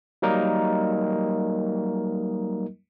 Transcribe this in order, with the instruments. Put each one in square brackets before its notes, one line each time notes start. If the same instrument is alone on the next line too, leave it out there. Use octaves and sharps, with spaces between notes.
[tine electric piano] F#3 G3 A#3 D#4 A#4 D#5